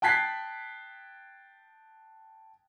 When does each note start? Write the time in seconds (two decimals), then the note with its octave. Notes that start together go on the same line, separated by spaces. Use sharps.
0.02 G5 A5 F#6 G#6 B6 C7